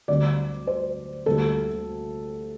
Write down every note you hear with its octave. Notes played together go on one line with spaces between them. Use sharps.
D2 D3 G3 C4 D5
C5
D2 C3 G3 A#3 A4